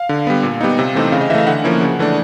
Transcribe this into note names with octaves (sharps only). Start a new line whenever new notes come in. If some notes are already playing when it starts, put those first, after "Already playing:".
Already playing: F5
D3
G3 B3
A#2
G3 B3 D#4
C3
E3 A3 C4 D#4
C#3 F5
D#5
E3 A3 E5 F5
D3 F#5
F3 A#3 C#4 E4
C#3
E3 A3 D4